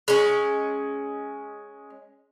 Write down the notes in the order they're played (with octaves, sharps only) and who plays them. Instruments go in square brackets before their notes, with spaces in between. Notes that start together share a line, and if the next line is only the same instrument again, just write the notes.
[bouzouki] G#3 C#4